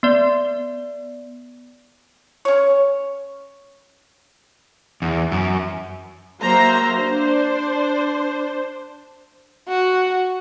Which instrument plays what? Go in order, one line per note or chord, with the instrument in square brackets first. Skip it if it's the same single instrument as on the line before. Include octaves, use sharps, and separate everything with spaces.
[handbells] B3 D5
[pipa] C#4 C#5
[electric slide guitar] E2
F#2
[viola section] F#3 A#3 C5 E5 A#5
D4 C5
[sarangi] F#4